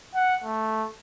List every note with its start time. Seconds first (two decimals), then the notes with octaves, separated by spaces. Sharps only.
0.15 F#5
0.44 A3